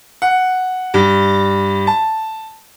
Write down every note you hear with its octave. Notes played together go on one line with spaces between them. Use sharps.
F#5
G2
A5